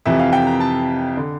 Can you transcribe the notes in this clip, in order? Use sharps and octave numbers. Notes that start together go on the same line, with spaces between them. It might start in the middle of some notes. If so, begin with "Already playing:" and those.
F2 C3 E3 E5
F5
G5
A#5
A5
D3